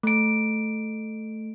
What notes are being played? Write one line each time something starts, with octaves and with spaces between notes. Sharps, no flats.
A3 D7